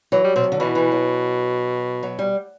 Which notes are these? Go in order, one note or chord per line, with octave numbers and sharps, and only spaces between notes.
E3 F#3
G3
B2 C4
C3
D3
B2 E3
E3
F#3
F#3
G3